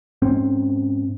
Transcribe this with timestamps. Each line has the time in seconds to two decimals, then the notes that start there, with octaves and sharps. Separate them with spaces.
0.22 G#2 C4 C#4